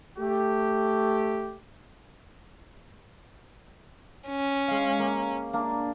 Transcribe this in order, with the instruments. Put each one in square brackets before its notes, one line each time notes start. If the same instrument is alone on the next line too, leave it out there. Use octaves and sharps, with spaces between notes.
[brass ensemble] A3 G4
[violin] C#4
[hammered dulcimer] G#3 F5
A#3
A#3 D4